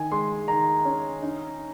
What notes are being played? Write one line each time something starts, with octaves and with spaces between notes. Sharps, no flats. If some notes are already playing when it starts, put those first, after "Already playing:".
Already playing: D#3 G#5
G#3 C6
D#3 A#5
C#4
D#4